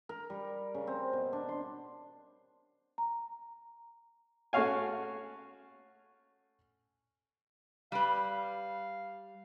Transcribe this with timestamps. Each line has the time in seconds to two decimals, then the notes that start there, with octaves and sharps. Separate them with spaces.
0.09 A#4
0.30 G3
0.74 C#3
0.87 C4
1.13 B2
1.33 D4
1.49 C6
2.98 A#5
4.53 A3 C#4 F#4 C#5 F5 G#5
7.92 G3 B4 F5